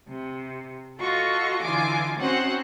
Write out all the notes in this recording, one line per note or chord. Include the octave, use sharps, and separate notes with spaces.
C3
F4 F#4 A4 D#5 C#6
D3 E3 D#4 F4 G#5 D6
C4 C#4 D#4 F#4 C5 F#5